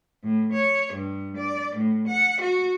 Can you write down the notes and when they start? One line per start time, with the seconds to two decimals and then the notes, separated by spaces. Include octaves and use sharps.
0.23 A2
0.52 C#5
0.93 G2
1.37 D5
1.76 A2
2.08 F#5
2.41 F#4